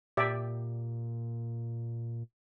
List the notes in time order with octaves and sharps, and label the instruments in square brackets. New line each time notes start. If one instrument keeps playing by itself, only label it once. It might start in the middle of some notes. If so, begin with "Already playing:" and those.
[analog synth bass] A#2 [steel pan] G4 D5 E5